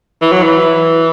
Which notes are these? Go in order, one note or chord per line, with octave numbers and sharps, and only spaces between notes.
E3
F#3
E3